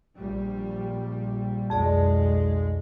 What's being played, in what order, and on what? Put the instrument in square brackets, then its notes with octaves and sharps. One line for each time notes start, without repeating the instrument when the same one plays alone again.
[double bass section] A#1 G3
[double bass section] B1 G#3 [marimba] F2 G#4 D5